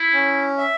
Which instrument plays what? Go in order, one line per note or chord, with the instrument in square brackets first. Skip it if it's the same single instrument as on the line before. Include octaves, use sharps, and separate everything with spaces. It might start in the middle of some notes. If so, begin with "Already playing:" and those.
Already playing: [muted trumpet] E4
[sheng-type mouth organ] C#4
E5